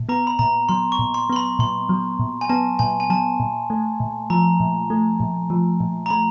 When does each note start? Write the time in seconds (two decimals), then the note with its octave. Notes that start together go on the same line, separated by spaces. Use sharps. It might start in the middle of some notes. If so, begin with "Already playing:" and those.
Already playing: A#2
0.09 B3 A#5
0.27 B5
0.39 A#2 A#5
0.69 F#3 C6
0.92 C#6
0.99 A#2
1.14 C6
1.29 B3 C6
1.36 B5
1.59 A#2 C6
1.89 F#3
2.19 A#2
2.41 G#5
2.49 B3 A5
2.79 A#2 G#5
3.00 G#5
3.10 F#3 A5
3.40 A#2
3.70 A3
4.00 A#2
4.30 F3 A#5
4.60 A#2
4.90 A3
5.20 A#2
5.50 F3
5.80 A#2
6.06 A#5
6.10 A3 B5